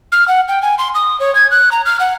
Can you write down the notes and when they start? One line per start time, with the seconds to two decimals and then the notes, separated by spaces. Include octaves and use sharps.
0.12 F6
0.28 F#5
0.48 G5
0.62 G#5
0.78 C6
0.95 D#6
1.20 C#5
1.35 G#6
1.51 F#6
1.72 A#5
1.86 F6
2.00 F#5